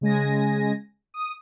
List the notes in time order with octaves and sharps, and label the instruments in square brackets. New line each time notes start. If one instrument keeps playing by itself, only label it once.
[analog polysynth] C#3 G#3 G#5 A#6
D#6